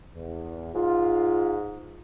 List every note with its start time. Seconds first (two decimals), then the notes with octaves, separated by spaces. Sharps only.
0.15 E2
0.75 G#2 F4